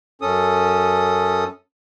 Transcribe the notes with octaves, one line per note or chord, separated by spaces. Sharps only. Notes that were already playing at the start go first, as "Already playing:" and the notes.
F#2 C#4 A4 D#6